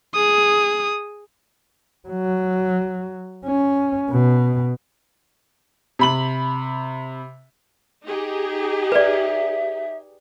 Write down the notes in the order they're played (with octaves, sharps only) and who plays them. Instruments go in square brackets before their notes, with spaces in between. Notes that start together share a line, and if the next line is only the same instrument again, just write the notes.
[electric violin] G#4 D#6
[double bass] F#3
C#4
B2
[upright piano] C3 B5 F#7
[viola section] D#4 G4 G#4
[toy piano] B4 D5 [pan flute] E5